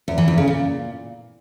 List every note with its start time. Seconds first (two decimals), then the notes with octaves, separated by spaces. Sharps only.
0.08 E2
0.18 E3
0.28 E2
0.38 C#3
0.48 A#2